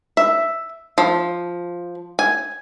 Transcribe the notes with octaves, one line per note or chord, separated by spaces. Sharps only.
E5
F3
G#5